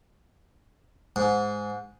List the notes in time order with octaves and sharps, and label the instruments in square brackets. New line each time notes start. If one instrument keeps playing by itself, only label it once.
[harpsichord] G#2